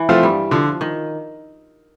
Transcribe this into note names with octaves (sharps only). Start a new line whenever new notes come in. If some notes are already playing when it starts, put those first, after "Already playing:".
Already playing: E3
F3 A3 C4 F4
G2 G3
D3 F3
D#3